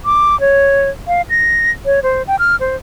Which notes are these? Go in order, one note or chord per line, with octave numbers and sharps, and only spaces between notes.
D6
C#5
F5
A#6
C#5
C5
G5
F6
C5